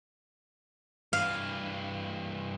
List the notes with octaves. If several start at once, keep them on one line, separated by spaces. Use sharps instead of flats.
G2 E3 F5